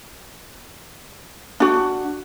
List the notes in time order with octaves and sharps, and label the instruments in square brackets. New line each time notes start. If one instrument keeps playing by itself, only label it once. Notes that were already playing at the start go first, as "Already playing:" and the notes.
[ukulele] D4 F#4